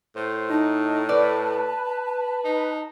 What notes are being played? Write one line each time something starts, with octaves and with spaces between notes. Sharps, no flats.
A2 C5
D#4 A5
B4 D5
D#4